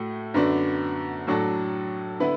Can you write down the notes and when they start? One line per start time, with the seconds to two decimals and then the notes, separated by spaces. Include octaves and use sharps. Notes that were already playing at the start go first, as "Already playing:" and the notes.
Already playing: A2 A3 F#4
0.34 F#2 D3 B3 D4 F#4
1.27 A2 F#3 D4 F#4 A4
2.20 D3 B3 E4 B4